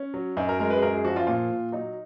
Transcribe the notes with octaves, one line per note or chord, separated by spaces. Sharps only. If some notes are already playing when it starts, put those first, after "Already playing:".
Already playing: C#4
F#3
F#2 D#4
A#4
G#3 A#4
B4
G#4
F#2 A#4
G#4
F3 F#4
F4
A#2 F4
A#2
F#3 D#4